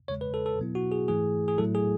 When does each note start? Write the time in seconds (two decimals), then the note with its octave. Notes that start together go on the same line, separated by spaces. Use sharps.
0.08 E2 C#3 G#3 C#5
0.21 B4
0.34 A4
0.46 A4
0.58 B2 F#3 B3 E4
0.75 F#4
0.92 G#4
1.08 G#2 E3 A3 E4 G#4
1.48 G#4
1.58 A2 F#3 A3 E4 A4
1.75 G#4